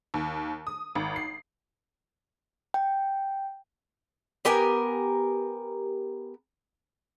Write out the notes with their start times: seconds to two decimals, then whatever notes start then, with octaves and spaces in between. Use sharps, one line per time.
0.14 D#2
0.67 D#6
0.95 G#1
1.16 C7
2.74 G5
4.45 B3 G4 A#4 G#5